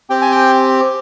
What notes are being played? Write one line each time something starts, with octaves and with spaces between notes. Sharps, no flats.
C4 G4 G5
G#5
G5